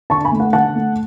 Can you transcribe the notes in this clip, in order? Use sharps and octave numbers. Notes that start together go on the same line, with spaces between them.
D3 A5 C#6
G#5 B5
A3
F#5
D3 F#5 A5
A3